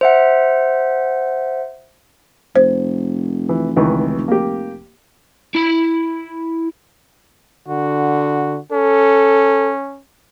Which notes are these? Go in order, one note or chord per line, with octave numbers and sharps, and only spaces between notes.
C5 E5 F#5
F1 C5
E3
C#2 D#3 E3
A#3 G4
E4 B5
D3 F#4
C#4 A4